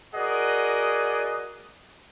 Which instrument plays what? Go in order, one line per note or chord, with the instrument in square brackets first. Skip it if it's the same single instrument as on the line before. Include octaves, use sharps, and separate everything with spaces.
[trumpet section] F#4 G#4 A#4 D5 D#5 F#5